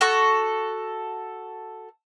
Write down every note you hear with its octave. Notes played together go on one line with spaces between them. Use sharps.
F#4 A4 C#6